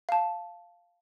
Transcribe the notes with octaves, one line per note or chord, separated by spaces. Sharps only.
F5 A5